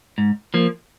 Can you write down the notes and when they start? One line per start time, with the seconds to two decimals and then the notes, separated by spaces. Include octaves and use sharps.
0.18 G#2
0.54 F3 A#3